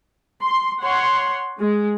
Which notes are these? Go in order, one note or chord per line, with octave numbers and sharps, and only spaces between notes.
C6
C#5 F#5 C6
G#3